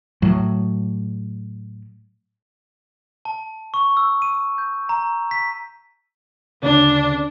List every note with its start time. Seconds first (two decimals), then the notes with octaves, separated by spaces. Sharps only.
0.22 A2 F#3
3.25 A5
3.74 C#6
3.97 E6
4.22 D#7
4.58 G6
4.89 A#5
5.31 B6
6.63 D2 C#3 D4